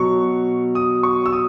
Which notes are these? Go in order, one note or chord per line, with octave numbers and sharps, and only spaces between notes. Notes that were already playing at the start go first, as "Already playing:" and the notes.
Already playing: B2 F#3 C#6
D#6
C#6
E6
D#6